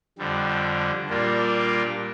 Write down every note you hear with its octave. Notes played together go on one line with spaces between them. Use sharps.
F2 D3 G3
A#2 G3 A#3 D4 F4